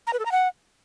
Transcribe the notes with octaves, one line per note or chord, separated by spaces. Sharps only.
A#5
B4
A4
A#5
F#5